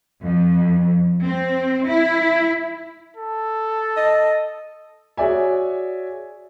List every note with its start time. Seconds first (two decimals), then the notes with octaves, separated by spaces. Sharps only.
0.24 F2
1.26 C4
1.88 E4
3.17 A4
3.97 D#5
5.17 F#4 G#4 C#5 D5 E5 G#5